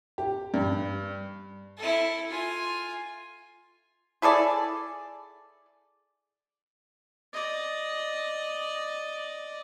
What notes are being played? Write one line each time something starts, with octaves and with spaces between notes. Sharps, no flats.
G4
G2
E4 A4
F4 G#5
E4 G#4 A4 D5
D5 D#5